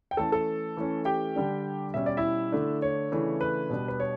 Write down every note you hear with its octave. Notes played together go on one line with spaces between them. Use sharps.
G5
E3 A3 C#4 A4 A5
A4 A5
E3 A3 C#4
G4 G5
D3 G3 D4
B2 G3 C#4 E5
D5
E4 E5
D3 A3 D4
C#5
C#3 E3 A3 D4
B4
B2 G3 D4
B4
C#5